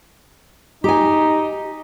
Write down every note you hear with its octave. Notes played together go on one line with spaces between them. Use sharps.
D#4 G4 G#5